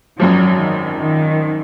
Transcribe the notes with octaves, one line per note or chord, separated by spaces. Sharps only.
G#1 F#2 F3 F#3
D#3
D#3